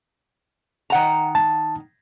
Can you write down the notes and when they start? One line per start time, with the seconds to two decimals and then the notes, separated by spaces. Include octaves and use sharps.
0.90 D#3 F#5 A#5
1.35 A5